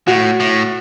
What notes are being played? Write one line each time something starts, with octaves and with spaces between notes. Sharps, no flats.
A2 F#4
A2